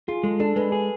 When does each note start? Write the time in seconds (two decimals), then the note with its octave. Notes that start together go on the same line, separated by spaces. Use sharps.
0.08 F4 G#4
0.23 G#3 A4
0.40 D4 A4
0.56 G#3 B4
0.72 G#4